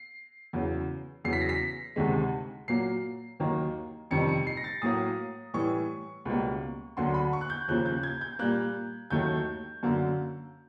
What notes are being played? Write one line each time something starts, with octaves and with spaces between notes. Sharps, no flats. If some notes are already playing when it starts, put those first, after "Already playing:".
Already playing: C7
E2 C#3 F#3
E2 C#3 F#3 C7
B6
A#6
B6
D2 C3 D#3 G#3
A#2 F#3 A#3 C7
D#2 D#3 F#3 A#3
F2 C3 D#3 G3 C#7
C#7
C7
A#6
A6
A2 F#3 A#3 D#6
A2 E3 G3 C#6
C#2 B2 G3 A#3
D2 D3 F#3 A#3 C6
B5
C#6
F#6
G6
D#2 C#3 F3 A#3 F#6
G6
G#6
G6
A#2 G3 A#3 F#6
D#2 D#3 F#3 A3 G6
F#2 D3 F#3 A#3